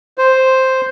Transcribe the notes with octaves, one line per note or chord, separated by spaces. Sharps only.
C5